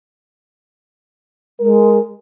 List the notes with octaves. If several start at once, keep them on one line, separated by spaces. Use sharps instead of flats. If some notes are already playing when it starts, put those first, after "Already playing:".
G#3 A#4